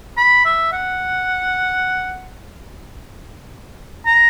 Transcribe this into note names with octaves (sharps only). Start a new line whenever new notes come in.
B5
E5
F#5
A#5